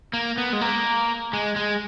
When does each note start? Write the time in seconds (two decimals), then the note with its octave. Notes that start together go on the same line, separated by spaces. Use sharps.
0.13 A#3
0.38 B3
0.53 G#3
0.61 A#3
1.33 G#3
1.56 G#3